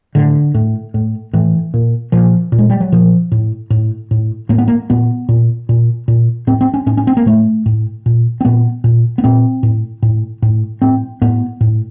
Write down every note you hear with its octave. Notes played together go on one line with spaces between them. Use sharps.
A2 D3
A2
A2
A2 E3
A#2
A#2 F3
A#2
G#3
G3
F#3
A#2 F3
A2
A2
A2
A2 A#3
B3
A#3
A#2 B3
A#2
A#2
A#2
A2 C4
C4
C#4
A2 C#4
C#4
C4
A#3
A2 A3
A2
A#2
C4
A#2 B3
A#2
B3
A#2 C4
A2
A2
A2
A2 C4
A2 B3
A2